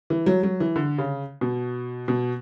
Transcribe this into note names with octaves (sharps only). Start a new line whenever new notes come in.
E3
F#3
F#3
E3
D3
C#3
B2
B2